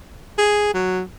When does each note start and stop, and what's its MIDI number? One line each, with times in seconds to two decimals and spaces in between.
0.38 0.70 68
0.74 1.02 54